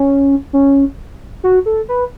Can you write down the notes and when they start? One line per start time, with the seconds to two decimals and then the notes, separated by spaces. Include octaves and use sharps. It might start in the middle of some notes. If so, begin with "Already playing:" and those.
Already playing: C#4
0.53 C#4
1.44 F#4
1.66 A4
1.89 B4